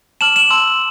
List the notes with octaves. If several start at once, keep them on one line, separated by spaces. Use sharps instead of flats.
A5 D6 F6 E7 F#7
E7 F#7
A5 C6 E6